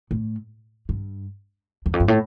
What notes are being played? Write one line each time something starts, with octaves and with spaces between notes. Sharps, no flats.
A2
G2
E2
F2
G2
A2